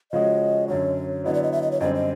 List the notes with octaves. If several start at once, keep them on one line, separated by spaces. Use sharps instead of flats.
C#3 F3 G#3 C#4 F#4 D#5
F#2 D3 F#3 C#5
D3 F#3 B3 E4 D#5
D5
D#5
E5
D#5
C#5
F#2 D3 G3 C4 D#5
D#5